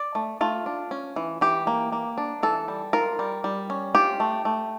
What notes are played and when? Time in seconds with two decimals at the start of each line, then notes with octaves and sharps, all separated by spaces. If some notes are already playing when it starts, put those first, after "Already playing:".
Already playing: D5
0.15 A3
0.41 A3 F4
0.66 D4
0.91 C#4
1.16 E3
1.41 E3 G4
1.67 A#3
1.92 A#3
2.18 D4
2.43 E3 A4
2.68 G3
2.93 F4 A#4
3.19 G3
3.44 G3
3.70 C#4
3.95 F4 G4
4.20 A3
4.45 A3